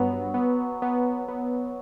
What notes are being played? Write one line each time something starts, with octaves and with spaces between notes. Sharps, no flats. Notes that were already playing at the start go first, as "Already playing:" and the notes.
Already playing: G2 F#3 B3
B3
B3
B3